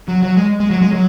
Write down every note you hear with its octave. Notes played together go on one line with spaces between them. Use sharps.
F#3
F#3
G#3
G#3
F#3
G#3
F#3